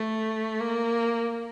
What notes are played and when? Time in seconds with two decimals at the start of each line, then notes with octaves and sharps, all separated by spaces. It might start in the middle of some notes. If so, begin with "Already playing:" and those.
Already playing: A3
0.61 A#3